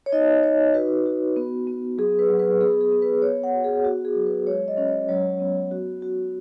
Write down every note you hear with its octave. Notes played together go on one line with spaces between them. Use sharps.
C#5
D#4 D#5
D#4 C#5
F#4 B4
F#4
B3
B3
F#3 G#4
B4
F#3
B4
B3 G#4
G#4
B3
B4
B3 C#5
F#5
F#4
G#4
F#4
G#4
F#3
B4
G#3 C#5
D#5
C#4
C#5
F#3 C#5
B3
F#4
F#4